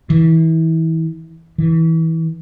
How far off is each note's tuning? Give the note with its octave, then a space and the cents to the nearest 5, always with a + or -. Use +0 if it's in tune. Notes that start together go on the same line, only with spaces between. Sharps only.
E3 -30
E3 -25